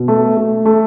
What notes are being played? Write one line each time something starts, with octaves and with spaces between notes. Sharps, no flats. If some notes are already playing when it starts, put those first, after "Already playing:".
Already playing: B2
A3
A3
A3